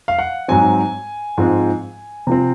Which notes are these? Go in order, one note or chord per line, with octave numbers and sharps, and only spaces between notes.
F5
F#5
G#2 F#3 C4 G#5
G#2 F3 G#3 C4
C3 F3 C4